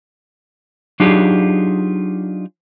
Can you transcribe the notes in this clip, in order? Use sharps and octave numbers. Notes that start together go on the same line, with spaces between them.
F#3 D4 D#4 F4 G4 G#4